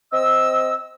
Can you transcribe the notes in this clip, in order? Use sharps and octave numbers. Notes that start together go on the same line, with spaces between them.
C4 D#5 E6